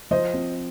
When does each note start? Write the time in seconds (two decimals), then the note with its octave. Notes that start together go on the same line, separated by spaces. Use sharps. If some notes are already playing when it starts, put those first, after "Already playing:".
0.11 F3 C5 D#5
0.34 C4 F4